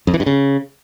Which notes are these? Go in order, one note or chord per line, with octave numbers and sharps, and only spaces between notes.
F2
E3
G2
C#3